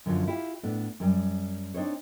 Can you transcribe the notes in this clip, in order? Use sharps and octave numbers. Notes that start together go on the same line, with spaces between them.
F#2 D3 F3 F#3
E4 F4 G4
A2 B3 D4
F#2 G3
C4 D4 D#4 C5 C#5